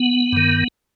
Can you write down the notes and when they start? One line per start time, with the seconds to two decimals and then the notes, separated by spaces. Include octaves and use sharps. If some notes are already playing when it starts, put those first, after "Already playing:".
Already playing: B3
0.33 G2 D#3